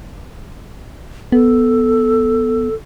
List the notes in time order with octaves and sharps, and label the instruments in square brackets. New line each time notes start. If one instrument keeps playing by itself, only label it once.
[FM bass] B3 [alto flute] A4